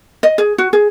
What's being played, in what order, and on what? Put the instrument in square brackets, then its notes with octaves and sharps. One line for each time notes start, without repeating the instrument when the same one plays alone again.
[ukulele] D#5
G#4
F#4
G#4